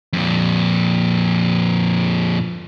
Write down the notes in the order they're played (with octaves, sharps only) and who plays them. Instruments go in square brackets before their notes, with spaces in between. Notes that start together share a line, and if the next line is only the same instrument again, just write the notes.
[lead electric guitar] F2 A#2